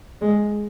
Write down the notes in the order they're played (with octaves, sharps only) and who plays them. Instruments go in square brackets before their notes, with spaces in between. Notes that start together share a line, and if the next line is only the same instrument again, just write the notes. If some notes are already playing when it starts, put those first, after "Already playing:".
[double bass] G#3